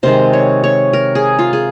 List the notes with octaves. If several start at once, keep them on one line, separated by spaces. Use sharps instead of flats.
C3 D#3 G#3 C5
C#5
C#5
A#4
G#4
F4
G#4